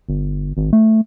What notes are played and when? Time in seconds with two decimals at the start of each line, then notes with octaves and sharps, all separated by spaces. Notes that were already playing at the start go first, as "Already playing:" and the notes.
0.09 G1
0.57 G#1
0.73 A3